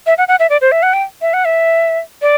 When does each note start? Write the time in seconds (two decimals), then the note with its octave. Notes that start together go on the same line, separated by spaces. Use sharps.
0.06 E5
0.18 F#5
0.28 F#5
0.39 E5
0.50 D5
0.61 C5
0.72 E5
0.83 F#5
0.93 G5
1.21 E5
1.33 F#5
1.45 E5
2.22 D5